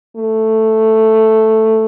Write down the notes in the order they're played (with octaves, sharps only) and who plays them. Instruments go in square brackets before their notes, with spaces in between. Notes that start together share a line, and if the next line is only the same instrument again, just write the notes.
[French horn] A3